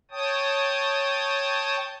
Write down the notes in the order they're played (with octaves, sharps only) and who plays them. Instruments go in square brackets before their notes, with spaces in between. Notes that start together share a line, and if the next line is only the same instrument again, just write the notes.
[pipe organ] C#5 G5 A5 D#6